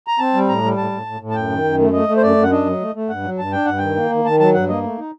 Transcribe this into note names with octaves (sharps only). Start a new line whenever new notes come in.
A#5
C4 A5
G3
A2 A#5
G3
A2 A5
A2
A2
A2
A5
F#2 G5
D#3
F#2
A3
A3 D#5
A3
C5
F#2 D5
F#2
F#5
D4 D#5
F#3
A3
A3
G2 F#5
F#3
G2 A5
D4 G5
G2 F#5
D#3 G5
A#3
D#3
D#3 A5
F#3 A5
G2 F#5
A#3 D#5
A3
D#4